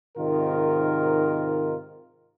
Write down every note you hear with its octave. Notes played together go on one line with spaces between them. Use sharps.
G#2 C3 D#3 D#4 F4 A#4